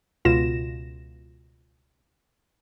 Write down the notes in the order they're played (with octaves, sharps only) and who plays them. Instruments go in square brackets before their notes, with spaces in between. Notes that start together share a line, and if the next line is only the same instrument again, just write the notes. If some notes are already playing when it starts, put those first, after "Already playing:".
[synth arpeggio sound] C#2 B2 F4 A#6 E7